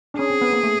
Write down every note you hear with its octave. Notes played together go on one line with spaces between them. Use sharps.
D4
C#4 G#4
C4
B3
A#3
A3